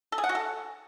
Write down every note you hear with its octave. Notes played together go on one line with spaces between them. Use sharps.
A4
G#4
F#5
F#4
A4